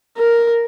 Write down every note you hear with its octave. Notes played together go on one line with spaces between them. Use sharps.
A#4